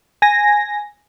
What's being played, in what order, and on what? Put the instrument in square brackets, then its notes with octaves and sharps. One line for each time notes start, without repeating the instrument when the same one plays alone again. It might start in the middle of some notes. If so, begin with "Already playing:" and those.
[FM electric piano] G#5 A#6